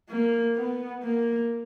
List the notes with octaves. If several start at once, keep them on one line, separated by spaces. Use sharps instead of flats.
A#3
B3
A#3